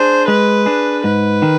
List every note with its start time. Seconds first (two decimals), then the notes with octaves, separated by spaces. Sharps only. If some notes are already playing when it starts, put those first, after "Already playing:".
Already playing: D4 G#4 C5
0.28 G#3 B4
0.66 D4 G#4
1.04 G#2 B4
1.42 D#3